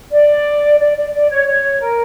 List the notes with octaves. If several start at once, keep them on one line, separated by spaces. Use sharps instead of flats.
D5
D5
D5
D5
C#5
C#5
A#4